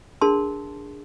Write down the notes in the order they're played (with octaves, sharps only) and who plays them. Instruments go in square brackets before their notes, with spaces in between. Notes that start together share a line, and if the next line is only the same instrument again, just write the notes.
[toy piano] D4 G#4 A#4 A5 C6